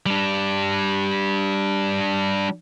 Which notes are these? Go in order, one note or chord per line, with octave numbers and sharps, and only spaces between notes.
G3 D4